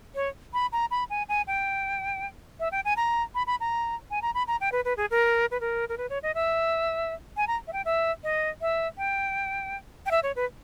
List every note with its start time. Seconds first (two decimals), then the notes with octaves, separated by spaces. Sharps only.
0.15 C#5
0.53 B5
0.72 A#5
0.91 B5
1.10 G#5
1.29 G#5
1.47 G5
2.60 E5
2.72 G5
2.85 G#5
2.97 A#5
3.35 B5
3.47 B5
3.60 A#5
4.10 G#5
4.22 A#5
4.34 B5
4.47 A#5
4.60 G5
4.72 B4
4.85 B4
4.97 G#4
5.11 A#4
5.51 B4
5.60 A#4
5.89 A#4
5.97 B4
6.10 C#5
6.23 D#5
6.35 E5
7.37 G#5
7.47 A#5
7.67 E5
7.73 G5
7.85 E5
8.24 D#5
8.61 E5
8.98 G5
10.06 G5
10.11 E5
10.23 C#5
10.36 B4